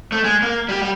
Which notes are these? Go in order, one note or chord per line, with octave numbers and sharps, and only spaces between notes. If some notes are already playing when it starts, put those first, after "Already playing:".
A3
G#3
A#3
G3 G4
G3